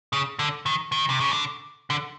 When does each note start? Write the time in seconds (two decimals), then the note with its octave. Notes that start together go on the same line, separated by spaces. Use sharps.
0.13 C#3
0.39 D3
0.66 D#3
0.92 D#3
1.10 C3
1.20 C#3
1.31 D3
1.90 D3